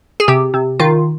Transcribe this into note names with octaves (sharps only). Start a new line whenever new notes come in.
G#4
C3 G4
C3
D#3 F4